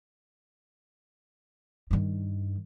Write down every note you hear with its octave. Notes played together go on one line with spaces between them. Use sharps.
G2 D#3